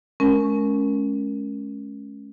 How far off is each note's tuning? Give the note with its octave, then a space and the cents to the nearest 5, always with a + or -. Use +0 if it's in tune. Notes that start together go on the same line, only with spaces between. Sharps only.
G#3 +40 C#4 +0 A#4 +0